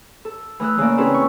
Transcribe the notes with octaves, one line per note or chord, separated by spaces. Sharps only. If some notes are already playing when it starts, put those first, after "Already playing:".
A4
E3 A3 D#6 E6 F#6
C#3 E3 A#3 D5
C4 C#4 E4 G#4 A4 B4
C#6